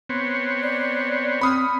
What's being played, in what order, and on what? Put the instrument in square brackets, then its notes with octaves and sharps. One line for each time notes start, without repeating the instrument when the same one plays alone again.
[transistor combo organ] B3 C4 C#5
[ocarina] D5
[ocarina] C4 [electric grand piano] B5 D#6 F6